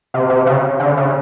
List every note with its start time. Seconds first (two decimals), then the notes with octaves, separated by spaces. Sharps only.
0.14 C3
0.29 C3
0.46 C#3
0.79 D3
0.97 C#3